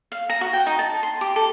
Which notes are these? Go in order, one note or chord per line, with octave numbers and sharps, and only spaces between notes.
F5
A#5
F#4
G5
D#4
A5
C6
G4
A4